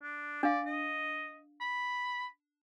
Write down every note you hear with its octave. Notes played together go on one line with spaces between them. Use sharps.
D4
D4 D5 F5
D#5
B5